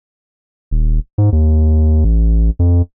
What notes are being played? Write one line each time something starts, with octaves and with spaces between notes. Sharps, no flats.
D#1
G#2
D#2
A1
F2